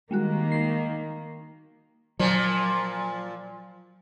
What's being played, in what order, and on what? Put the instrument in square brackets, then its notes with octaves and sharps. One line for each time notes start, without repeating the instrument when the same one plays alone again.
[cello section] D#3 A#3 [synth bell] G3 G#3 F#4
[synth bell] C7
[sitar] A#2 F3 [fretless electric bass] F#3